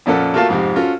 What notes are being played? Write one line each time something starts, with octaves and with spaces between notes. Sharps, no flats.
F2 A#2 C#4 A4 F#5
A3 A#3 F4 F#4 F5 A5
F2 G#2 C3
C#4 F4 F#4 A4